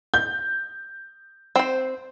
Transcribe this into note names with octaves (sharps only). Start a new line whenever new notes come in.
G6
C4 C5